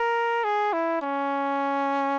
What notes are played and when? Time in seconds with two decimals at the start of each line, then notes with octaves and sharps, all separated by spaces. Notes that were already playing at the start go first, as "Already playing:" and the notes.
Already playing: A#4
0.44 G#4
0.73 E4
1.02 C#4